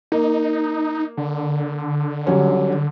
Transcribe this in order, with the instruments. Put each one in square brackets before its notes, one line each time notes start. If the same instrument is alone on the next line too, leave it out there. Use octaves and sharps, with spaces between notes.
[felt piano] A#3 [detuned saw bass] D#4
[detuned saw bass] D3
[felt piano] F#3 G3 C#4